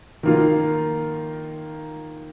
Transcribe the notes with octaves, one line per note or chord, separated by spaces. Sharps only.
D#3 A#3 F4